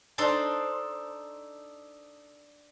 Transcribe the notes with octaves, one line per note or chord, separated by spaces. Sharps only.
D4 D#4 A4 C5